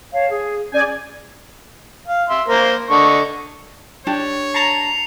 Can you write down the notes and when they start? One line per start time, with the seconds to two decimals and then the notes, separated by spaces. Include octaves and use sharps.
0.13 C#5 F5 A5
0.30 G#4
0.72 C#4 G#4 D5 G#5 G6
2.07 F5
2.29 E5 C6
2.48 A#3 A#4 C5
2.90 D3 D#5 C#6
4.07 D4 G4 C#5
4.54 A5 A#5 C7 C#7 F7